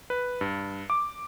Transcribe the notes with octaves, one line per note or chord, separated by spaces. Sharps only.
B4
G2
D6